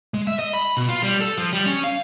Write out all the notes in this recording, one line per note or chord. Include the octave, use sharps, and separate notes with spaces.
G#3
E5
D#5
B5
B2
F4
G3
A4
F3
G3
C#4
F5